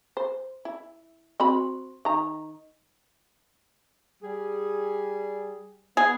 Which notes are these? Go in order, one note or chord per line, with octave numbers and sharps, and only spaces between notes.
C5
E4
C4 F#4 B5
D#3 A#5
G3 G#4
B3 G#4